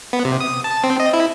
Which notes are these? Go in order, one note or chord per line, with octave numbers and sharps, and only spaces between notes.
B3
C3
D#6
A5
C4
D#5
E4